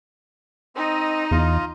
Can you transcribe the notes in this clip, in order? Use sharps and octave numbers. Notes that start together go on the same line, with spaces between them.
C4 D#4 D#5
E2 F4